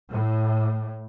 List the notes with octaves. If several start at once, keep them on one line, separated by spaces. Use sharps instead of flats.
A2